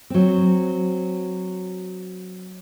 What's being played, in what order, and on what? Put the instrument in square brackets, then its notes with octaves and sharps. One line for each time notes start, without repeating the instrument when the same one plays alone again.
[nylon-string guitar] F#3 C4